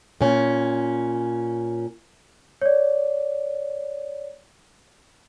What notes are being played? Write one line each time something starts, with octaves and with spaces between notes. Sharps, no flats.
A#2 C#4
C#5 D5